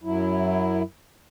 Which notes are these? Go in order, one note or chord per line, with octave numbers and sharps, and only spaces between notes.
F#2 F#3 E4